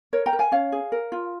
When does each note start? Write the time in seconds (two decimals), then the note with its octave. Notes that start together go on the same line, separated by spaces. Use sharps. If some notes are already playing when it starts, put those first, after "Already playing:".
0.13 A#4 C#5
0.26 G5 A#5
0.33 A#4
0.39 F5 G#5
0.52 C#4 C#5 F5
0.72 G#4
0.92 A#4
1.12 F4